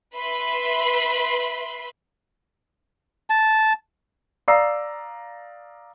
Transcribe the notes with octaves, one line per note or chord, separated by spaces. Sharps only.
B4 E5 B5 C6
A5
D5 F5 A#5 D#6 E6 C7